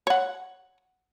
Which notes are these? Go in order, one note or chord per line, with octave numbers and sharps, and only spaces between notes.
C#5 F#5